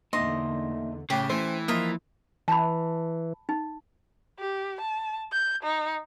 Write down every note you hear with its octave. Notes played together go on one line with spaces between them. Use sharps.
E2 D3 A3 A#3 D#4 D#5 E5 C6
A2 C#3 D4 G4
E3 A3 C#4 C5
F3 A#3 F4 A#4 D#5 E5
E3 A5 B5
D#4
G4
A5
G6
D#4